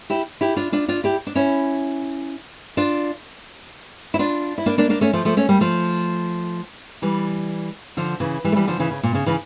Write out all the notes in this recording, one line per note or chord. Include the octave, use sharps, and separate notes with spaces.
E4 G4
E4 G4
D4 F4
D4 F4
D4 F4
E4 G4
D4
C#4 E4
D4 F4
E4
D4 F4
E4
A#3 D4
A#3 D4
A#3 D4
A3 C#4
F3 A3
F3 A3
A3 C#4
G3 A#3
F3 A3
E3 G3
D3 F3
C#3 E3
E3 G3
A3
E3 G3
D3 F3
C#3 E3
C#3
A#2
C#3
C#3 E3